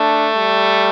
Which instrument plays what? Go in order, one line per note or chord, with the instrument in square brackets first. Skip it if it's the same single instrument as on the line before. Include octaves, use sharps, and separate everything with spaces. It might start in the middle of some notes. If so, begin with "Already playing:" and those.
Already playing: [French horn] A3 [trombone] D4
[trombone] G3